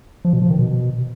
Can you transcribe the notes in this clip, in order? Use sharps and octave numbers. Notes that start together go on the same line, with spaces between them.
F3
B2
F3
D#3
B2